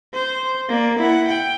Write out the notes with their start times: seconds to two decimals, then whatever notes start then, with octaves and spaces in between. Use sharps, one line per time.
0.14 C5
0.69 A#3 D5
0.98 E4 F#5
1.27 G5